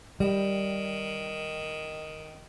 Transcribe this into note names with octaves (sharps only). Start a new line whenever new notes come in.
D#3 G3